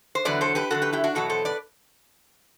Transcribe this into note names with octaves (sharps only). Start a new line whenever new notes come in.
C5
E2 D3 F#3 B4 D5
A4 C5
G4 B4
E2 D3 F#3 F#4 A4
G4 B4
E4 G4
D4 F#4
E2 B2 F#3 F#4 A4
A4 C5
B4 D5